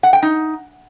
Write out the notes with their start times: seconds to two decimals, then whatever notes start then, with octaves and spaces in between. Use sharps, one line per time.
0.03 F#5
0.13 G5
0.23 D#4